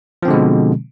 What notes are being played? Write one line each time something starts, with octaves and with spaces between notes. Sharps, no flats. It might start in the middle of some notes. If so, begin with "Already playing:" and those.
B2 D3 F3 G#3 C4